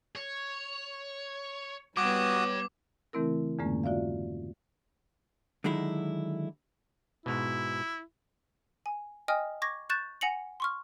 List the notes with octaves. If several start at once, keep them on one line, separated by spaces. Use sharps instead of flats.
C#5
G3 B3 F#4 C#5 G5 D6 D#6
C#3 E3 A3 C4 E4 A#4
F2 G#2 D3 G#3 A#3 C#4
F4 F#4 D5 E5 F5
D3 D#3 F#3 G#3 D#4 E4
G#2 B2 E4
G#5
D#5 G5 G#5 D#6 F6
C#6 D6 G#6 A#6
C#6 F#6 G6 A6 E7
F#5 G#5 A#6 C#7 F7 F#7
C6 C#6 F6